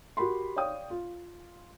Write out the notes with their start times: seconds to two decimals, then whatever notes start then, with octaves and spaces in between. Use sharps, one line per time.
0.17 F#4 G4 A#4 B5 C6
0.56 C#5 D5 F5 G5 D#6
0.90 F4